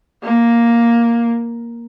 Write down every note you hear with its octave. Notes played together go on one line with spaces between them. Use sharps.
A#3